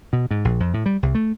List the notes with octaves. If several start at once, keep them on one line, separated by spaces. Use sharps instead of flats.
B2
G#2
A#1
F2
A2
G3
C2
A3